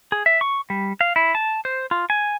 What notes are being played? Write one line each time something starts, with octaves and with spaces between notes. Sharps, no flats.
G#4
E5
C#6
G3
F5
E4
A5
C5
F4
G#5